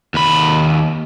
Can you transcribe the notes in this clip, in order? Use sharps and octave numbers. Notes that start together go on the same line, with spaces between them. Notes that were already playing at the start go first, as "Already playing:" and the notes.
D#2 B5